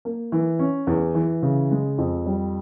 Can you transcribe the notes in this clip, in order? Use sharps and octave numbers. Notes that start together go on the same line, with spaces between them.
A#3
E3
C#4
E2
E3
C#3
G#3
F2
G3